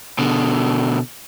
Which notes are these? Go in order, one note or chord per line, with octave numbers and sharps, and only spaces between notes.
B2 D3